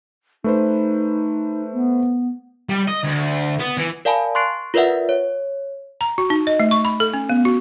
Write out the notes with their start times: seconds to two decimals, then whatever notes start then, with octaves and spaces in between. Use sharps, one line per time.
0.44 A3 D#4 B4 C5
1.73 B3
2.69 G3
2.87 D#5
3.03 D2
3.60 B3
3.77 E3
4.05 A#4 D5 F5 G#5 A5 B5
4.35 C6 C#6 F#6 A6 C7 D7
4.74 F4 A#4 B4 D5 E5 F#5
5.09 C#5
6.01 A#5
6.18 F#4
6.30 D#4
6.47 D#5
6.60 A3
6.71 C#6
6.85 B5
7.00 A4
7.14 C#4
7.29 B3
7.45 F#4